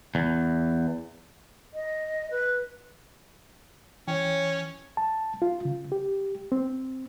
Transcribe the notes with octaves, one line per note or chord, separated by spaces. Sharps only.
E2
D#5
B4
E3 C#4 C#5 G5
A5
F4
C#3
G4
C4